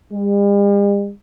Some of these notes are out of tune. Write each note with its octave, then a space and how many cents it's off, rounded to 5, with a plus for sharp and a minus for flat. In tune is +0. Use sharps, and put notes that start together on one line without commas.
G3 +45